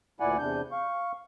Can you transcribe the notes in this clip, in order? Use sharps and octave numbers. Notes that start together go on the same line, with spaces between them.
D2 A#2 E4 D5 F#5 G#5
E2 C3 D4 G6
F5 C#6